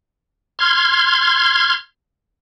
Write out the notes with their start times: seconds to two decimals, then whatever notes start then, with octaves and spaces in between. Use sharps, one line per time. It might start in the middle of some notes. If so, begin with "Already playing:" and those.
0.59 C6 F6 G#6